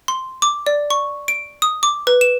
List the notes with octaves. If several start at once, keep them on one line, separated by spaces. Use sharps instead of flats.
C6
D6
D5
C#6
D7
D#6
D6
B4
E7